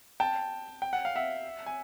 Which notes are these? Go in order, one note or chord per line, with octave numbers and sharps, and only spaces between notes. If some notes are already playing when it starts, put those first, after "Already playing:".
G5 A5
G5
F#5
F5
E5 F#5
G#5